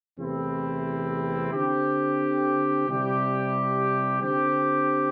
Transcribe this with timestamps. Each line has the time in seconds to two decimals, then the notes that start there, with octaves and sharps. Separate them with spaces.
0.18 E2 C3 A3 C4 E4
1.52 D3 C4 G4
2.87 C3 G3 E4 G4
4.20 D3 C4 G4